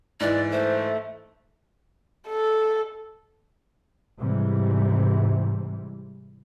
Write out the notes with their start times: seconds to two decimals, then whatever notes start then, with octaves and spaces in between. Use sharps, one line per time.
0.20 G#2 E3 D5
0.52 A3 C5
2.28 A4
4.17 G#2 C3 E3 G3